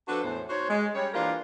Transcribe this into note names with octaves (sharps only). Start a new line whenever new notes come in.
F3 D4 F#4 A4 B4
E2 A2 C5
D#4 F#4 C5 C#5
G#3
G3 C#4 C#5
E3 A#3 D4 F4 G4 A#4